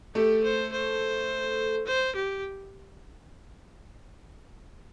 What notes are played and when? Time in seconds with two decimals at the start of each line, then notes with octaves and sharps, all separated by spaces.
0.15 A3 G4
0.44 C5
0.72 C5
1.87 C5
2.16 G4